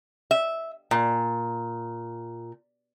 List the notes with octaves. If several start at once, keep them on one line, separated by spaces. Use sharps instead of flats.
E5
A#2